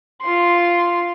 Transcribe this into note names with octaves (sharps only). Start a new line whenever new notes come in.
F4 C6